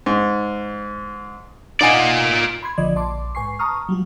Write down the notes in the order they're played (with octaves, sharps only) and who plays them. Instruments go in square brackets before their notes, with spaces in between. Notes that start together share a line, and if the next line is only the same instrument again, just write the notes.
[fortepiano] G#2
[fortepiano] D#4 F#5 G#5 [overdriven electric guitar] F4 D5
[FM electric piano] B5 C6 G#6
A#1 D3 F3 D5 D#5 G#6
A#1 D5 A5 C6 D6
G#2 B4 G#5 C#6 C7
A5 A#5 C#6 D#6 F6
F#3 G3 F4